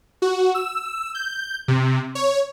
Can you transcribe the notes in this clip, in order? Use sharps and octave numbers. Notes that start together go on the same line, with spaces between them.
F#4
E6
G6
C3
C#5